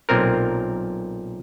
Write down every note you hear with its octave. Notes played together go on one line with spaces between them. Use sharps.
B1 A#2 C4 A#4